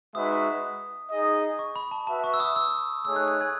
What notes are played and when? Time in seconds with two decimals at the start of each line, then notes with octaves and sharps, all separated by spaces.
0.15 G#3 D#4 F#4 B4 E5 D#6
1.11 D#4 G#4 D#5
1.59 C#6
1.76 B5
1.91 A5
2.07 F#4 B4 E5 A5
2.24 C#6
2.34 E6
2.40 D#6
2.56 E6
3.05 A3 D#4 G#4 C#5 E6
3.16 F#6
3.28 F#6
3.41 G#5 G#6